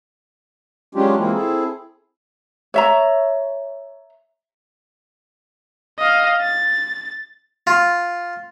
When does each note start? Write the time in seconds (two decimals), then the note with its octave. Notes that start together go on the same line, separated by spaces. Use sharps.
0.95 F#3 G#3 C#4 D4 F4 G4
1.17 E3 G#3 A#3 C4 E4 F4
1.33 C4 E4 G#4 A4
2.74 C#5 E5 A#5
5.99 D#5 F5
6.41 A6
7.67 F4